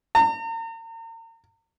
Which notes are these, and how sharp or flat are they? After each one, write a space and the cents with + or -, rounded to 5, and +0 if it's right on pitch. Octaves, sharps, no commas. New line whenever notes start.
A#5 -40